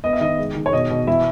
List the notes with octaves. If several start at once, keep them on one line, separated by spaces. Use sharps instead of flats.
B3 D#5
E5
D#3 D#5
G#3
D#3
C#5
B2 D#5
B2
E3 E4 E5